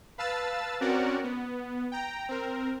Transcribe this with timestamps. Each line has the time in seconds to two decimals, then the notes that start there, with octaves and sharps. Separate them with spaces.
0.18 B4 F5 A5 E6 A6
0.80 C4 C#4 F#4 A#4 D5 F#5
1.24 B3
1.92 G5 A#5
2.29 C4 A#4